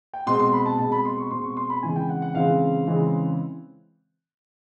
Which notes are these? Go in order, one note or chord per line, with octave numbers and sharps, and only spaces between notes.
G5
B2 G#3 C4 C6
C6
B5
A5
B2 G#3 C4 A5
B5
C6
C#6
B2 G#3 C4 C6
C#6
C6
B5
C#3 E3 G#3 C4 G#5
G5
F#5
F#5
C#3 E3 G#3 C4 F5
C#3 E3 G#3 C4